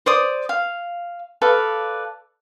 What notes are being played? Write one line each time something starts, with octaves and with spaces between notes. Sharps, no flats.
C5 D5 D#6
F5
A4 B4 D5 F5